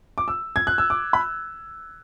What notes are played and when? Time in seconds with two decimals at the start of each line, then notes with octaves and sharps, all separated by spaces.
0.18 D6
0.28 E6
0.56 G#6
0.67 F#6
0.78 E6
0.90 D6
1.13 B5